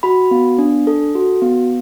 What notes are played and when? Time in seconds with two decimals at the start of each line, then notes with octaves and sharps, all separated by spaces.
0.03 F#4 B5
0.31 B3
0.59 D4
0.87 A4
1.15 F#4
1.42 B3